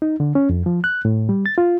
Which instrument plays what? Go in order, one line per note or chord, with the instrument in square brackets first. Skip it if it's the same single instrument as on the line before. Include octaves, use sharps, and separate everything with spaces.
[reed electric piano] D#4
D3
C#4
F2
F3
F#6
A2
G3
A6
F4